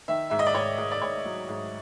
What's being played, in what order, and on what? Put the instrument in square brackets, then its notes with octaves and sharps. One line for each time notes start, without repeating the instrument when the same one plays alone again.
[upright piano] D#3 E5
G#2 E5
D#5
D5
G#2 C#5
G#2
D5
G#2 C#5
F#3
G#2